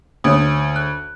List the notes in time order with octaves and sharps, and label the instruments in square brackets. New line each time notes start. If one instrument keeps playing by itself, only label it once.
[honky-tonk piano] D2 [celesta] C#5 D#6
[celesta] F#6